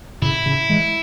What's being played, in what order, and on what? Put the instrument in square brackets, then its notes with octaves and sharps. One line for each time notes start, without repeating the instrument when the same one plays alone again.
[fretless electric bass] A2 C#3 [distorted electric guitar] E4
[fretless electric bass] A2 C#3
E3 G#3